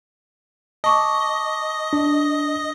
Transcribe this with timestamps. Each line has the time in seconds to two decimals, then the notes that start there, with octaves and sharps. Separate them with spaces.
0.84 D#5 A5 C#6 D6
1.93 D4